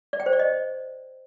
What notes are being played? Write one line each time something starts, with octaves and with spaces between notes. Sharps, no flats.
D5
G5
C5
D5
D#5